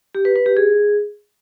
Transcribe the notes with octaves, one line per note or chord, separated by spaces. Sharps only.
G4
B4
B4
G4
G#4